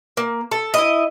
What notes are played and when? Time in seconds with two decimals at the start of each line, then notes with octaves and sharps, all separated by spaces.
0.17 A#3
0.51 A4
0.74 E4 D#5